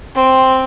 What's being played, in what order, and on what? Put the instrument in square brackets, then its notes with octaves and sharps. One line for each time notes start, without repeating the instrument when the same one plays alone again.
[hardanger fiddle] C4